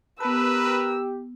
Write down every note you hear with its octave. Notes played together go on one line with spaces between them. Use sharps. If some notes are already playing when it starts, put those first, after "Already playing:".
B3 G4 A#4 B4 A5 E6